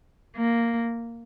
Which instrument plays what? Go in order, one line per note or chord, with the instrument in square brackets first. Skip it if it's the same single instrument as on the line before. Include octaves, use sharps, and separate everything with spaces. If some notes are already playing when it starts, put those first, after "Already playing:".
[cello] A#3